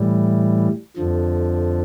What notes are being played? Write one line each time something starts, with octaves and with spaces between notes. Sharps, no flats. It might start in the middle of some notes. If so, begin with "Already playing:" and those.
Already playing: A2 E3 G3
F2 D3 F3